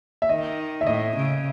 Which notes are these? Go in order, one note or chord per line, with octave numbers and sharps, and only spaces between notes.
E5
D#3 D#5
E5
A2 D#5
C#3